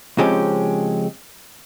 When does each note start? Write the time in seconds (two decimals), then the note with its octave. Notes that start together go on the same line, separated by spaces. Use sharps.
0.18 C#3 F3 G#3 C4 C#4 G4